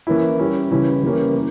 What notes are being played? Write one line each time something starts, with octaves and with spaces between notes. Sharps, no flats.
E3 A#3 C#4 E4
G3 C#4 E4
C#3 E3 G3 C#4 E4
E3 G3 A#3 C#4
A#3